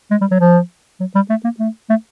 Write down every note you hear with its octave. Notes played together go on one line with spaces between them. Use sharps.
G#3
G3
F#3
F3
F#3
G3
A3
A#3
A3
A3